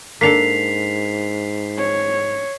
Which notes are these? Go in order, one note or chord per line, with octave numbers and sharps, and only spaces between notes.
G#2 A#3 D4 A4 B6 C7 F7
C#5